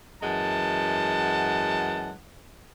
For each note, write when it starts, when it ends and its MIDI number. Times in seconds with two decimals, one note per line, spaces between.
0.22 2.12 42
0.22 2.12 52
0.22 2.12 56
0.22 2.12 78
0.22 2.12 81